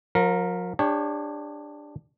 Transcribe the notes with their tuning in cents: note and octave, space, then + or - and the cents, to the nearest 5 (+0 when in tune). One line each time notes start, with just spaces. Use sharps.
F3 +45 A#4 +0
D4 +10 G4 +40 C#5 +0